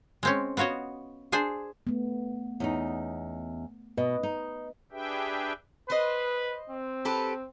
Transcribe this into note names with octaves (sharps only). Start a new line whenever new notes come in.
G#3 C4 C#4
B3 F4 F#4 C#5 D#5
D4 G#4 C5 G#5
A3 B3
E2 C#4 D#4
B2 B4 D#5
D#4
D4 G4 G#4 B4 E5 G5
B4 C5 D#5
C4
G4 A4 B4